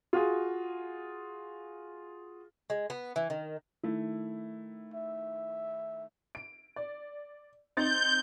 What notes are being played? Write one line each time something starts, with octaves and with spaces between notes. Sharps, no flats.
F4 F#4 G#4
G#3
B3
E3
D#3
D#3 A3 E4
E5
D7
D5
C4 D#4 G6 A6